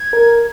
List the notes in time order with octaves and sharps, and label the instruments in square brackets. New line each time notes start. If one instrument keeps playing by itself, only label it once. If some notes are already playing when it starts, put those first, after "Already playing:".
Already playing: [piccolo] G#6
[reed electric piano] A#4